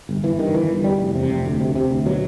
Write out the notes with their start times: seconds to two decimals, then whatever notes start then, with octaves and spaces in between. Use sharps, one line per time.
0.09 G1
0.24 G1 E3
0.38 G2 D#3
0.54 G1 E3
0.69 G1
0.84 E2 G3
1.00 F1
1.15 C3
1.30 F1
1.45 D2
1.60 C3
1.75 C3
1.91 D2
2.06 B2 F#3